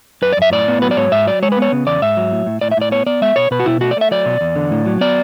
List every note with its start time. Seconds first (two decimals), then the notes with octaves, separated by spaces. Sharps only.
0.22 F#2 B4
0.32 D5
0.37 F#2 E5
0.52 A2 D5
0.68 B3
0.82 F#3 B4
0.91 D5
0.96 G#2 C#5
1.12 G#2 E5
1.26 F#3 D5
1.42 G#3 C#5
1.52 B4
1.57 B3 C#5
1.72 C#3
1.86 E2 D5
2.02 G#2 E5
2.17 F#3
2.32 A2
2.46 A2
2.61 A2 D5
2.72 E5
2.77 A2 D5
2.91 B3 C#5
3.06 B3 D5
3.22 G#3 E5
3.36 B2 C#5
3.51 B2 B4
3.60 F#4
3.66 B2 E4
3.81 A3 F#4
3.91 D5
3.97 A3 E5
4.11 F#3 D5
4.26 B2
4.41 E2
4.56 D3
4.71 A2
4.86 F#3
5.01 B3 D5